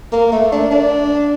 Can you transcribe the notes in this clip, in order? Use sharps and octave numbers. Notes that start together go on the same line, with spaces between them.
A#3
A3
D4
D4